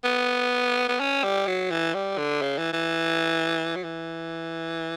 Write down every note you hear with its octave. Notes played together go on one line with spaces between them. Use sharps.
B3
B3
C#4
G3
F#3
E3
G3
D3
C#3
E3
E3
F#3
E3